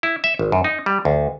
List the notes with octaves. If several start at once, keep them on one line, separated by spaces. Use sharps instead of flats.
E4
E5
G#1
F#2
D#4
G3
D2